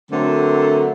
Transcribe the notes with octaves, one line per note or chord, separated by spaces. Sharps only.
D3 F#3 A3 C4 A#4 C5